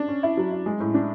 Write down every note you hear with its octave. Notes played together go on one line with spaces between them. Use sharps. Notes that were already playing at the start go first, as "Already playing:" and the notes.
Already playing: D4
C#4
E4
F#3
E4
G#3
A2
D4